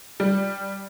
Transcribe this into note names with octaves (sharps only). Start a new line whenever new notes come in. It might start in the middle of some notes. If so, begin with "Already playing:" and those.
G3